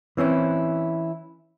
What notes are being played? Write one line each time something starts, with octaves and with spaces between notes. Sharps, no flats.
E3 C4 C#4 E4